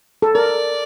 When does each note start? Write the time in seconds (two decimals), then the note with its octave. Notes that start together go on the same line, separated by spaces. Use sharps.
0.22 A4
0.35 A#4 D5